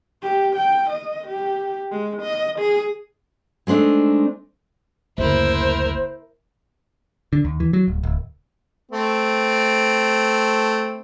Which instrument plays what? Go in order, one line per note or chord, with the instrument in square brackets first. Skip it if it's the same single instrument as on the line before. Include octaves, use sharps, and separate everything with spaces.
[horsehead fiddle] G4
G5
D#5
G4
G#3
D#5
G#4
[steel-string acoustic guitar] G#3 A3 C4 D4 D#4
[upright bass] F#1 D2 [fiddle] E4 A#4 [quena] C5
[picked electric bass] D3
D#2
E3
F#3
D1
D1
[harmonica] A3 C4